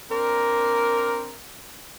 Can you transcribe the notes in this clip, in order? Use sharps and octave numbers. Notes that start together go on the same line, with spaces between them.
C4 D4 A#4